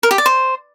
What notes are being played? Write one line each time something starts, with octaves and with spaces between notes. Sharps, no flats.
A#4
G4
D5
C5